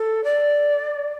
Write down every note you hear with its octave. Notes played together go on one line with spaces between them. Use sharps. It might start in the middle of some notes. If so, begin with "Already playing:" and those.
Already playing: A4
D5